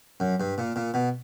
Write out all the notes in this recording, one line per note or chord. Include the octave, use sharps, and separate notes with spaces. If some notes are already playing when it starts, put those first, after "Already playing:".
F#2
G2
A#2
A#2
B2